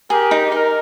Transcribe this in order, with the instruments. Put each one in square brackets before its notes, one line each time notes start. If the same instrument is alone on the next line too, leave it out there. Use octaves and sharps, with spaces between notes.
[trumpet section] G4 A#4 [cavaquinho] G#4
[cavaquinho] D#4
[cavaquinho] D#4 [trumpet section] A#4